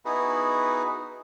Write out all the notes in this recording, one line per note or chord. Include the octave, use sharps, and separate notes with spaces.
B3 D#4 E4 F#4 G#4 B4